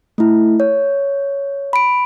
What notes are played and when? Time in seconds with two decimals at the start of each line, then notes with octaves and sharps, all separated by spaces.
0.18 A3 E4
0.60 C#5
1.73 B5 D7